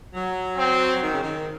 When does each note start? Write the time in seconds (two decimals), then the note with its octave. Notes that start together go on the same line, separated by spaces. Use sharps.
0.13 F#3
0.58 C4
1.02 D#3
1.13 C#3
1.23 D#3